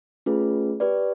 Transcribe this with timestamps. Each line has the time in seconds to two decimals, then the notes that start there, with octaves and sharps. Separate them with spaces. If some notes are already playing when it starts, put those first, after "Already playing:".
0.26 A3 C#4 F4 G#4 B4
0.80 G4 B4 D5